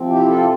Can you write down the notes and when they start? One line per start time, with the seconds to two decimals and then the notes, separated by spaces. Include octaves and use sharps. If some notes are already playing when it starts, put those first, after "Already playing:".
Already playing: C3 F3 C4
0.08 E4 G4
0.28 F4 A4